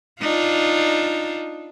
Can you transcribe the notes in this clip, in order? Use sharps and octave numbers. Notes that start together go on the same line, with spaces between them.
D4 D#4 F4